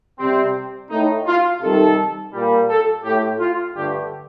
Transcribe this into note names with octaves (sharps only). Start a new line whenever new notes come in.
C3 G3 C4
A2 A3 D#4
F4
C3 D#3 G3 A4
A#2 G3
A4
A2 A3 G4
F4
G2 D3 A3 G4